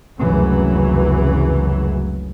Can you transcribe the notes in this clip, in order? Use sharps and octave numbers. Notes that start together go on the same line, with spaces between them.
F1 C#2 F#2 E3 F#3